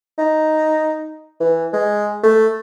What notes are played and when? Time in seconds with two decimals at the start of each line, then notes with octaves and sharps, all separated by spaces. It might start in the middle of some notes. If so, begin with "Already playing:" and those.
0.18 D#4
1.40 E3
1.73 G#3
2.23 A3